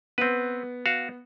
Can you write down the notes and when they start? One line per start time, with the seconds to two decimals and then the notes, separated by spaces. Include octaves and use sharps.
0.18 B3 C4 B4
0.86 F#4 F5